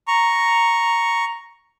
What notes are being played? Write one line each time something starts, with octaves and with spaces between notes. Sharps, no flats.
A#5 C#6